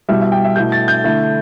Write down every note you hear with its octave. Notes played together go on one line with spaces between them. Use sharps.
B2 G3 E4 E5
E5
G5
E5
B2 A3 E4 G6
A6
G6
D3 A3 E4